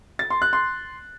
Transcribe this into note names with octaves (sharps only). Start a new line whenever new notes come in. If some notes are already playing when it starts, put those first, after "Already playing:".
A6
C6
F#6
C6